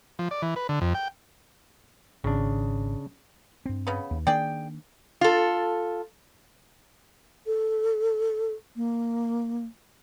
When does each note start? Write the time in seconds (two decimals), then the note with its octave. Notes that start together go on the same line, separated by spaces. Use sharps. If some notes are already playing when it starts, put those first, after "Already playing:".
0.19 F3
0.31 D5
0.42 E3
0.56 B4
0.69 D3
0.81 F2
0.94 G5
2.24 G#1 C#3 D4
3.66 G2 C4
3.87 C#3 B3
4.11 D#2
4.27 D#3 A#3 D4 G#4 D5 G5
5.21 F4 A4
7.46 A4
8.76 A#3